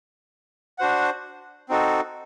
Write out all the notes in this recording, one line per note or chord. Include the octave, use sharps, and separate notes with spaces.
D4 F#4 C5 F#5
C4 D#4 F#4 A4